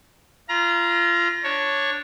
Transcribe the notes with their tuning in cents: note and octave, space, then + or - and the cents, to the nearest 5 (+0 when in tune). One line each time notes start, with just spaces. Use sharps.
F4 -25 A#5 +20
D4 +0 C#5 +0